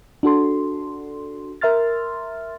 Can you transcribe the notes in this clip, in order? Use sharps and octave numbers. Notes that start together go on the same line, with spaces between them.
D4 F#4 A4 C6
A#4 E5 C6 F6 A6